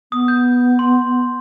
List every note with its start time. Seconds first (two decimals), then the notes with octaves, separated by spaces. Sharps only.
0.12 B3 D#6
0.28 G6
0.79 C6